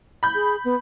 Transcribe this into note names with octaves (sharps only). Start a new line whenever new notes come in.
B5 G6
G#4
B3